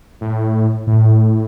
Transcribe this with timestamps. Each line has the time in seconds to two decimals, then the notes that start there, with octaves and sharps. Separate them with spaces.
0.21 A2
0.87 A2